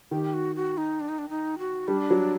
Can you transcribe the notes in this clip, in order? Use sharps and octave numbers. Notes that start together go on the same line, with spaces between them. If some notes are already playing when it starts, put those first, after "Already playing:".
D#3 G4
F#4
F#4
D#4
D4
D#4
D4
D#4
F#4
G3 D4
F#3